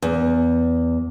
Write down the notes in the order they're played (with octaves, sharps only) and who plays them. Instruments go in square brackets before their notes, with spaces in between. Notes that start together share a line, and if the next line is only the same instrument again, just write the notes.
[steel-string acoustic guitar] E2